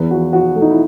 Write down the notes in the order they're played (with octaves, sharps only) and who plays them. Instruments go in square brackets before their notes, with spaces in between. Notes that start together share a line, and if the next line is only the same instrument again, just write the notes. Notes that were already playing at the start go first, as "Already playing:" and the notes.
Already playing: [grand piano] E2 B4
F3 F#4
F3 F#4
A3
D#4
E4